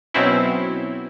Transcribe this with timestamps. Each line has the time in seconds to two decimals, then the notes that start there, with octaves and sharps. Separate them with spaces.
0.14 B2 F#3 C4 C#4 E4